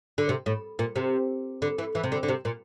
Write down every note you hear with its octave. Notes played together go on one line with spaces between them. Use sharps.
D3
C3
A2
A#2
C3
D3
E3
E3
C3
D3
D3
C3
A#2